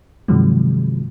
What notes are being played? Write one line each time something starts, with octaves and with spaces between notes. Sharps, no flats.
G2 C3 D#3 F3 F#3 G#3